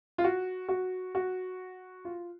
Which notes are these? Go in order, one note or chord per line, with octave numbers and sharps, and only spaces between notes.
F4
F#4
F#4
F#4
F4